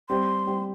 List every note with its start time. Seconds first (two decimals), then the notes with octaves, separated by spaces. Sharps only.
0.09 G3 C4 G4 C5 C6
0.46 G3 C4 G4 C5